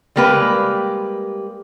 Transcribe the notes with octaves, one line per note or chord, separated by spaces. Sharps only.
G3 G#3 A#3 G4 B4